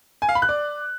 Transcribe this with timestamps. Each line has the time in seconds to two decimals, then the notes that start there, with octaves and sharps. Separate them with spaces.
0.22 G#5
0.29 F5
0.35 B5
0.42 F#6
0.49 D5